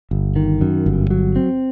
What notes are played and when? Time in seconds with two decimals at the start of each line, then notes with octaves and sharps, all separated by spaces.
0.11 G1
0.36 D#3
0.61 F#2
0.86 G1
1.11 F#3
1.36 C4